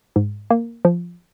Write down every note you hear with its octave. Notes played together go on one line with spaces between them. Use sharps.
G#2
A#3
F3